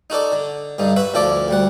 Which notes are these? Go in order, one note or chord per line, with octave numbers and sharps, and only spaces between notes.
D#4 F#4 A4 D5
D3
G2 D3 D#4
F#4 B4 E5
D2 F3 E4 A4 D5 D6
D2 G3 F#5